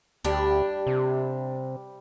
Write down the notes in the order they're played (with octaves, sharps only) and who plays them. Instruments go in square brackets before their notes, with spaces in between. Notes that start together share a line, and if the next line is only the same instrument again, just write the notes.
[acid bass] D2 [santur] G3 [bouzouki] D4 G4
[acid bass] C3